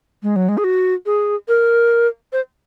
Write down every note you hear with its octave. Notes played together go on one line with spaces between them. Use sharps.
G#3
F#3
G#3
G#4
F#4
G#4
A#4
C5